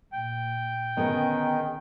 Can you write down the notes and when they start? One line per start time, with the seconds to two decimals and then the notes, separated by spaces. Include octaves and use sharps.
0.12 A#2 G5
0.97 D3 D#3 B3 C#4 G#4 A#4